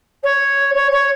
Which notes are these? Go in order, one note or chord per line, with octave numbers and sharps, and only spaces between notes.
C#5
C#5
C#5